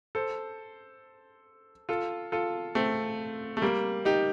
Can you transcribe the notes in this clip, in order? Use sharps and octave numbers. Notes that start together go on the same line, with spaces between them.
A4 C5
F4 A4
F4 A4
A3 C4
A3
G3 A#3
D#4 G4